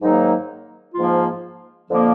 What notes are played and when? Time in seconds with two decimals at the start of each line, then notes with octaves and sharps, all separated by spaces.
0.01 G#2 D#3 F#3 A#3 D#4
0.95 G#2 F3 A#3 F4
1.89 F2 D3 F3 A#3